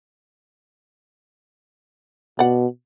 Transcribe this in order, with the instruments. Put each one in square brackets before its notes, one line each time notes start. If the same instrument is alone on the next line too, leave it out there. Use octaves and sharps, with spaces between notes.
[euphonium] B2 [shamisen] D5 F#5